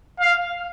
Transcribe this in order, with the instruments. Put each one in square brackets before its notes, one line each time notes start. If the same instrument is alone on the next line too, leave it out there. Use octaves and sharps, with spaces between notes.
[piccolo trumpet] F5